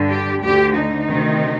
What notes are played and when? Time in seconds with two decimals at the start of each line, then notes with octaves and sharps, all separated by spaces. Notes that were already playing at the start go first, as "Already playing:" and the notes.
Already playing: G2 D3
0.10 G4
0.42 D2 D3 G4
0.75 D#4
1.08 D2 C3 D#3